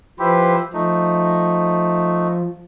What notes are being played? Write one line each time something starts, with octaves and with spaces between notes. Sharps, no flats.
F3 E4 G4 B4 C5
F3 A3 D#4